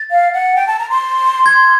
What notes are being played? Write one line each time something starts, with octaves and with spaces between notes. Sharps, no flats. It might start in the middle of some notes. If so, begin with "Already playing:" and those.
Already playing: A6
F5
F#5
G5
A5
A#5
C6
G#6